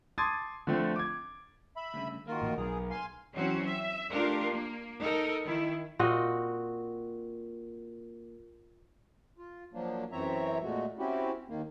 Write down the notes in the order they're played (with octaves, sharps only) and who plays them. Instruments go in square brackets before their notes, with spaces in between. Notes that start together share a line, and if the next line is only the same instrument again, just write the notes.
[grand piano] A5 C6 D6 D#6 G#6 A6
D3 F3 A3 C4
D6 G#6
[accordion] E5 B5
[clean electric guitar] D2 G2 C#3
[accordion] D#3 F4 A#4 [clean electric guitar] A#3 F#4
[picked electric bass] A1 A#2
[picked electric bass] B1 [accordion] G#4 [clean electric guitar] A#4
[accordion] F5 G#5 C6
[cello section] E3 F#3 C4 C#4 F#4
E5
A3 D4 F4 G4 A#4
A#3
D#4 A4 A#4
D#3 E4
[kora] A#2 C4 F#4 D#5
[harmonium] F4
F3 F#3 A#3 D4
F#2 E3 C4 C#5 E5 A#5
A#2 G#3 A3 F#4
C4 C#4 E4 F#4 G4
D#2 D#3 A#3